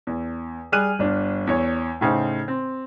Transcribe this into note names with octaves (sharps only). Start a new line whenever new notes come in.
E2
G3 G#4 F6 F#6 D#7
G1 D4
E2 C#5
A2 C#3 D#4 C5
C4